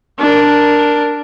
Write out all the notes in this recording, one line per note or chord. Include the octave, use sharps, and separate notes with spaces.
D4 A#4